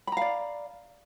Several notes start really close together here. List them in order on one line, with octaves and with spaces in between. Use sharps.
B5 A#5 F5 D5